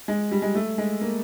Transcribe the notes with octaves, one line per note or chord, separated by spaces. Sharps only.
G#3
G3
G#3
A3
G#3
A#3